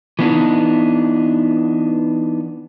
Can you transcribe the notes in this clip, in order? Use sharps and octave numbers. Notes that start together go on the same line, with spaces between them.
E3 B3 D4 D#4